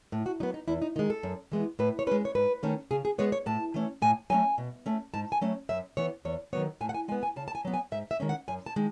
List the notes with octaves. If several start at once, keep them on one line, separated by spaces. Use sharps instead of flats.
A2
F#4
F#3 B3 D#4
D#4
E2 E4
D#4
D#3 G#3 D#4
A4
F#2
E3 G#3 B3
A2 B4
C#5
G#3 C#4 B4
C#5
G#2 B4
D#3 A3 C#4
C#3 G#4
G#4
G#3 B3 C#5
C#5
A2 A5
E3 A3 C#4
A2 G#5
F#3 A3 C#4 G#5
B2
A3 C#4
G#2 A5
G#5
F#3 A3 C#4
F#2 E5
E3 B3 C#5
E2 C#5
D#3 F#3 B3 C#5
A2 G#5
F#5
G#5
G#3 B3 G#5
G#5
C#3 A5
A5
G#5
F#3 B3
G#5
G#2 E5
E5
D#3 G#3 C#4
F#5
F#2 G#5
A5
D#3 G#3